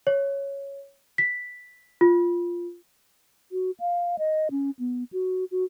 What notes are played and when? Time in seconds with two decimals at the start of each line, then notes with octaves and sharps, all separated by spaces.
0.07 C#5
1.18 B6
2.01 F4
3.52 F#4
3.80 F5
4.19 D#5
4.51 C#4
4.79 B3
5.13 F#4
5.51 F#4